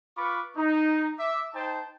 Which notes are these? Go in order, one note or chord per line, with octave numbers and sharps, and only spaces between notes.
F4 B4 B5 C#6 D6
D#4
E5 D6
D#4 C5 G5 A5